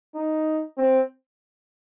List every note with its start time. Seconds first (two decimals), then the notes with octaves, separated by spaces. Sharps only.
0.15 D#4
0.78 C4